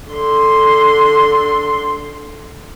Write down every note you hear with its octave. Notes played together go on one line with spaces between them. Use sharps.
D3 C6